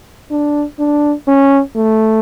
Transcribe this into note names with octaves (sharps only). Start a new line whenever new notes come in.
D4
D4
C#4
A3